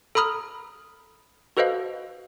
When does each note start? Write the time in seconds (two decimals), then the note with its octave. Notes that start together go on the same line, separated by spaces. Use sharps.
0.15 A4 A#5 B5 D#6 F6
1.57 F#4 A4 B4 C5 D#5 F5